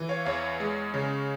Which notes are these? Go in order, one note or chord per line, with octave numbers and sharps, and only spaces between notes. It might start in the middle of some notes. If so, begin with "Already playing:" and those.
Already playing: E3
C#5 F5
E2 C#5 F5
G#3
C#3